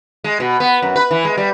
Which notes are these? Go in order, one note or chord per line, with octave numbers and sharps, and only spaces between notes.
G#3
B2
B3
F#2
B4
E3
G#3
G3